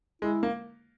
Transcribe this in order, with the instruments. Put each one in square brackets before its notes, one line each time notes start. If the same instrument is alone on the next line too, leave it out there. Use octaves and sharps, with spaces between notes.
[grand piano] G#3 [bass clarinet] E4
[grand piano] A#3